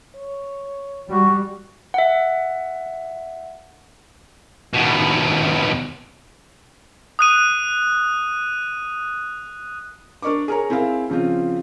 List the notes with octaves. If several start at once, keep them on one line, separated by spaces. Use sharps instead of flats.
C#5
G3 F#4
E5 F#5
D#2 B2
D#6 F#6 D#7
D4 A#4 D5 C#6 D6
G#4 A#4 C#5 A#5
C4 E4 G#4 A#4 F5
C#3 F3 C4 F4